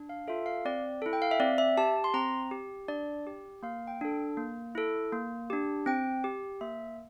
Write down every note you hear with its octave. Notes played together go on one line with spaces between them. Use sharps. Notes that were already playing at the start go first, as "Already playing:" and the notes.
Already playing: D4
F5
F4 A4 E5
F5
C4 D5
E4 A4
G5
F5
E5
C4 D5
E5
G4 A5
C6
C4 A#5
G4
D4 D5
G4
A#3 F5
G5
D4 A4
A#3
E4 A4
A#3
D4 G4
C4 G5
G4
A#3 E5